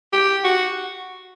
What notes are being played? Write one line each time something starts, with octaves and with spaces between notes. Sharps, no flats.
G4
F#4